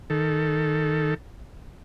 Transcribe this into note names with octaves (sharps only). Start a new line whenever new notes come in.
D#3 A4